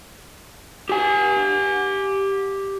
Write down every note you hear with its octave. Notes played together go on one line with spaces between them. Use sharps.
G4 G#5